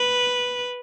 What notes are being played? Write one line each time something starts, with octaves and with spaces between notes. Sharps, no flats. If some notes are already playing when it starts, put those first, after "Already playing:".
Already playing: B4